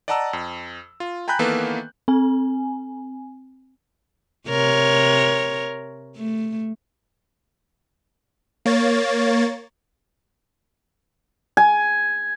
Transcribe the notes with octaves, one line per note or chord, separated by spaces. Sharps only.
D5 D#5 F#5 A5 A#5 E6
F2
F4
G5 G#5 A#5 B5 F#6 G6
D#3 E3 A#3 B3 A4 B4
C4 G#5
C3 A#4 C#5
A3
A#3 C#5 A6
G#5